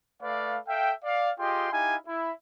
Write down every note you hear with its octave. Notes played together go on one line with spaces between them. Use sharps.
A3 B4 D5 F5
A4 E5 F5 G5
D5 F5
F4 G4 G#4 D#5 G5 C6
D#4 E4 G4 F5 G#5
E4